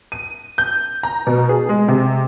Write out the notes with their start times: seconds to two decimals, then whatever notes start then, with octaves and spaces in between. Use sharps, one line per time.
0.12 D#7
0.58 G6
1.03 A#5
1.27 B2
1.49 G#4
1.69 G#3
1.88 C3